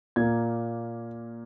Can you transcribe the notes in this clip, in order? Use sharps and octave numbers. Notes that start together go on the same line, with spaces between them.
A#2 A#3 G#6